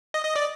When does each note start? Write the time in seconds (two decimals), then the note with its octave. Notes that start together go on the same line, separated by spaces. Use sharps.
0.14 D#5
0.24 D#5
0.36 D5